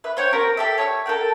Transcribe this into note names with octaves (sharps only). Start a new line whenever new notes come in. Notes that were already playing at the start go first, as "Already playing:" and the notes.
B4 E5
C5 C#5 G5 C#6
B3 C4 G4 A#4
G4 A4 E5
C#5 D#6 E6
A4 A#4 F#5 G5